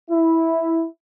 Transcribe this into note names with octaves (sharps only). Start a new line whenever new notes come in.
E4